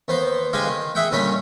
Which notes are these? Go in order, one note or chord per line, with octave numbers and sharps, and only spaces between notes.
D#2 B3 C5
D3 G#3 G4 F5 G#5
D#3
G#4 E5 F#5 G5
A#2 D3 D#3 G3 C#4 B5